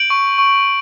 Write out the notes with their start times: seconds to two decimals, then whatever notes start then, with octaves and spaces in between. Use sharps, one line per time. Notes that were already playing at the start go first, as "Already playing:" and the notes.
Already playing: G6 D7 F#7
0.10 C#6
0.38 C#6